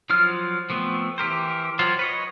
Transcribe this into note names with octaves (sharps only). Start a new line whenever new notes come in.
F3 F#3 F4 F6
F3 A3 B3 C4
E3 G4 A#4 C5
F#3 F4 C5
B4 C#5 D#5